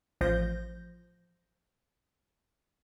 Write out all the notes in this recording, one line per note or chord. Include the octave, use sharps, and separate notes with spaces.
A1 F3 G6 A#6